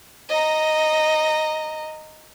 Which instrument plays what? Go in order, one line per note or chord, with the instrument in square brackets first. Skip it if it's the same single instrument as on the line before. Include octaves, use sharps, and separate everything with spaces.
[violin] D#5 A#5